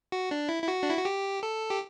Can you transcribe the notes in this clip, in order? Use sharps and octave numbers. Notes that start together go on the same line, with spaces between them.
F#4
D4
E4
E4
F#4
D4
E4
F#4
G4
A4
G4